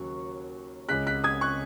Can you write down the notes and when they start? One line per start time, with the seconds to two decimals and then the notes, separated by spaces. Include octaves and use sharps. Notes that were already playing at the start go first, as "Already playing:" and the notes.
Already playing: D#2 C#3 F#3 C#6
0.89 C#2 C#3 G#3 F#6 B6
1.07 F#6 B6
1.24 D#6 G#6
1.41 C#6 F#6